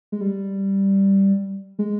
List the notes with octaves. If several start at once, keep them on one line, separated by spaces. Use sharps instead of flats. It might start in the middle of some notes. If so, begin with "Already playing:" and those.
G#3
G3
G#3